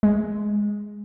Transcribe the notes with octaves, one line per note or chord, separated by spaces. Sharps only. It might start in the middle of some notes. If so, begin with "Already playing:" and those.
G#3